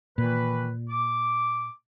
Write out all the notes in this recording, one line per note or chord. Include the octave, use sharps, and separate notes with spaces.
A#2 D#3 E3 B4
D6